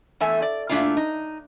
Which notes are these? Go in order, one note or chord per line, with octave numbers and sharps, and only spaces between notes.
E2 A3 E5 G#5
D5
A#2 D#3 A3 D4 E4 F4
D#4